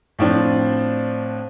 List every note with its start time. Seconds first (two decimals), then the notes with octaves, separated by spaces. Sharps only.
0.19 A2 F3 C4 D4